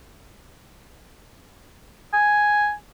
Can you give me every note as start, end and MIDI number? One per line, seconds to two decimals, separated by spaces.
2.13 2.72 80